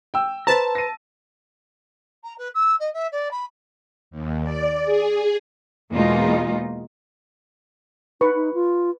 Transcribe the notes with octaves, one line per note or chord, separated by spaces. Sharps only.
G5 E6
B4 C5 A5 A#5
A#6 D#7
A#5
B4
E6
D#5
E5
D5
B5
D#2
D5
G#4
E2 B2 G#3 A#3 D#4 F4
D#4 B4 C#6
D#4
F4